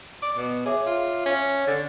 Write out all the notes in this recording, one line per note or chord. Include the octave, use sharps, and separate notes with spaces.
D5
B2
G#4 C#5 E5 D6
F4
C#4
D3 A6